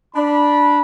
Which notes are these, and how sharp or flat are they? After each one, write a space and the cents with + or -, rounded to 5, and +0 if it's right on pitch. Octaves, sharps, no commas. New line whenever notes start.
D4 +0 B5 -20